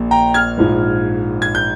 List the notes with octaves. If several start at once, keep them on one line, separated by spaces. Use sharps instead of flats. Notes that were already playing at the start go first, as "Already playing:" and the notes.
Already playing: A#1 A#2
G5 A#5
F6 G#6
A#1 G#2 F3
G#6
G6